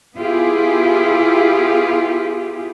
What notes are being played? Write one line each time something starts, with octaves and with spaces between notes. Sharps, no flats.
B3 E4 F4 G4 G#4